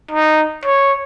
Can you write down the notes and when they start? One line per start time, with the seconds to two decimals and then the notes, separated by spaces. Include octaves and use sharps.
0.11 D#4
0.65 C#5